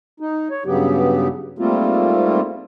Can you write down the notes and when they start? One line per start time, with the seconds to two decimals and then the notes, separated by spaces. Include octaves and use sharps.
0.20 D#4
0.51 C#5
0.66 G2 C#3 F#3 B3 G4
1.59 G#2 G3 A3 A#3 C4 F4